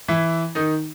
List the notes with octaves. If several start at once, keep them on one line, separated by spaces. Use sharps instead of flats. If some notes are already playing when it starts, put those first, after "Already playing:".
E3 E4
D#3 D#4